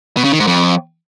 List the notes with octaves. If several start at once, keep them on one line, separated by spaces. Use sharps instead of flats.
B2
C#3
D#3
G#2
F2